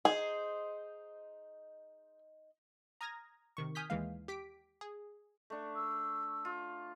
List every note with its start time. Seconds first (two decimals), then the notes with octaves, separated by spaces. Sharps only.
0.05 D#4 G#4 C5
3.01 A#5 D#6 F6 G#6 A#6
3.57 C3 D#3 C#6
3.75 G#5 D#6 F6 G6 B6
3.90 D#2 E3 G#3 F5
4.28 G4 B6 D7
4.81 G#4
5.50 A3 D4
5.76 E6
6.45 F4